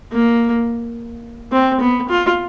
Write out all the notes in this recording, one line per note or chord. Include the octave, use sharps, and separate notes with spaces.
A#3
C4
B3
F4